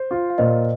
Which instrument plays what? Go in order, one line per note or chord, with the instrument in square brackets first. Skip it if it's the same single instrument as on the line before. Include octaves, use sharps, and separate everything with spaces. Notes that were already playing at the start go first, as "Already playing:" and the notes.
Already playing: [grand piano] C5
F4
[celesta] F5
[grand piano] A#2 [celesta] C5 D#5